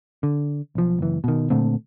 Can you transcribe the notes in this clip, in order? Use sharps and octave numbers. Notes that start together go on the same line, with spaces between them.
D3
B1 F3
F#1 E3
B2 D#3
A#2 D3 A3 C4